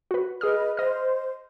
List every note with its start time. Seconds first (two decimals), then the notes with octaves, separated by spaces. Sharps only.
0.11 F#4 B4
0.41 G#4 B4 D#5 D#6 F6
0.77 C5 D#5 F6